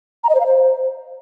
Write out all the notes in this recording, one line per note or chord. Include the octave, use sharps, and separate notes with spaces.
A#5
D#5
C5
F5
C5